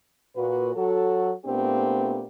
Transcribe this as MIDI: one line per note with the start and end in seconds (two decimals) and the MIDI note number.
0.36 0.72 46
0.36 0.72 66
0.36 0.72 71
0.75 1.32 54
0.75 1.32 66
0.75 1.32 69
1.46 2.27 46
1.46 2.27 57
1.46 2.27 59
1.46 2.27 60
1.46 2.27 62
1.46 2.27 67